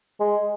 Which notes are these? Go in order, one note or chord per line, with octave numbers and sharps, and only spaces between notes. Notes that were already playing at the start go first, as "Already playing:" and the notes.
G#3